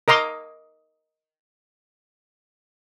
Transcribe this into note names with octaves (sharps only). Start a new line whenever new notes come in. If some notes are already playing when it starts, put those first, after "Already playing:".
A#4 D#5 A#5 C6 D6